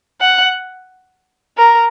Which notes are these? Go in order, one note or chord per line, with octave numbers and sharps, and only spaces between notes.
F#5
A#4